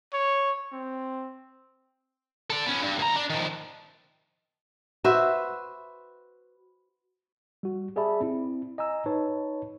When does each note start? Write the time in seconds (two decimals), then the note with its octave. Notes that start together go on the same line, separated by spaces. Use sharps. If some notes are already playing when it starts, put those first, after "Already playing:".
0.13 C#5
0.73 C4
2.50 A4 D5
2.66 B3 C#4
2.83 G2
2.99 D2 A#5
3.16 D4
3.30 D#3 F3
5.04 F#4 B4 C5 E5
7.63 G3 F#4
7.96 G4 G#4 D5 E5 A5 B5
8.20 C4 E4
8.78 D#5 G#5 A#5 E6
9.06 D#4 B4 C#5 A5